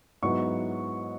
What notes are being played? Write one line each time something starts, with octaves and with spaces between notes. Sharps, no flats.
G#2 F#3 B3 E4 C#6